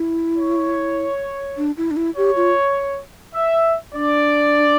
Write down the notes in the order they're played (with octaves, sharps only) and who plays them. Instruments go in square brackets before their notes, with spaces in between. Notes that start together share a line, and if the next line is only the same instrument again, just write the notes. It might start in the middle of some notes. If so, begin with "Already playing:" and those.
Already playing: [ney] E4
[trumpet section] C#5
[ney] D4
E4
D4
E4
[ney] G4 [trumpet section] C#5
[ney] F4
[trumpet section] E5
[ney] D4 [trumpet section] D5